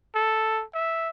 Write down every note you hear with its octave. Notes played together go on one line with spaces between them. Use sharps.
A4
E5